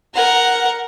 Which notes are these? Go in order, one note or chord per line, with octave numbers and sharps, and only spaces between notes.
A#4 F#5